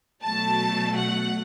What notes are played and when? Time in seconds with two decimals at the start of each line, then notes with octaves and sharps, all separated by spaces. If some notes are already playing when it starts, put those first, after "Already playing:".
0.23 B2 F#3 A3 A5
0.97 F#5